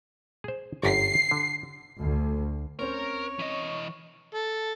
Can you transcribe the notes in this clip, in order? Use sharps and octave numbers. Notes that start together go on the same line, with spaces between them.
G#4 C5
G1 F#2 G5 C7
D3
D2
C4 C#4 A#4 C5 C#5
E3 D#5
A4